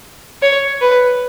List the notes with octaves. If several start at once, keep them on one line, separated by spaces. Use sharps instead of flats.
C#5
B4